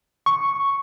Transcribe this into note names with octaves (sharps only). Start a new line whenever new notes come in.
C#6